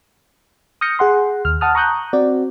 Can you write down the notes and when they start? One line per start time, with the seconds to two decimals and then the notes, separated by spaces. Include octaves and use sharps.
0.81 D#6 F6 G6 A#6 C#7
0.99 G#4 F#5 C6
1.45 D#2 F6
1.61 F#5 A5 D#6 F6
1.75 A#5 C#6 D#6 F#6 G6
2.13 C4 F#4 D5